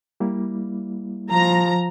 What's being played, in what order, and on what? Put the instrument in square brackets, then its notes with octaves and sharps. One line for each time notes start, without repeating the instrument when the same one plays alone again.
[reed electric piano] G3 A#3 E4
[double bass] F3 [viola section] A#5